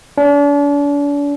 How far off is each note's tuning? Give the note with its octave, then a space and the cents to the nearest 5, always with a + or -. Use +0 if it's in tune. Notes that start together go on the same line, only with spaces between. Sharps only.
D4 -40